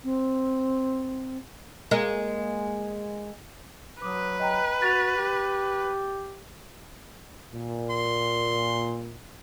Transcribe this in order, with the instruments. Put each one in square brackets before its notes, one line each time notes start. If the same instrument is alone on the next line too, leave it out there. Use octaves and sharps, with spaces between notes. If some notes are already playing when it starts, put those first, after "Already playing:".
[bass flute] C4
[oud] G#3 A#3
[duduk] F#3 [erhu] B4 [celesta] D6 D#6
[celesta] D#5 G5 A#5
[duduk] F#4 [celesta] A6 B6 F7
[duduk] G4
[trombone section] A#2
[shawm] C6